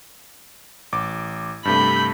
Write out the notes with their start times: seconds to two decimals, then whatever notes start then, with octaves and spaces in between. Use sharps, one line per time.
0.92 A1 D6
1.65 G2 C3 A3 B5 G6